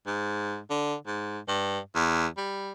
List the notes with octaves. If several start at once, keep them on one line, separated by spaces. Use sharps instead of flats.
G#2
D3
G#2
G2
E2
G3